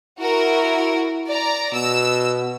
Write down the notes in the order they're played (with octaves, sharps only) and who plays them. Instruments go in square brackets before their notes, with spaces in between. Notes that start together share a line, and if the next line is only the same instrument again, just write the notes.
[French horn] E4 [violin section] F#4 A#4
[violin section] D5 A#5
[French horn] B2 [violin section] E6